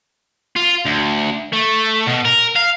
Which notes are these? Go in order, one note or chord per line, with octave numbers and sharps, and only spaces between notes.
F4
D2
A3
B2
A#4
F5